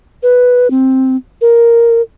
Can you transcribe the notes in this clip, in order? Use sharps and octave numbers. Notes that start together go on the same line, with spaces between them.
B4
C4
A#4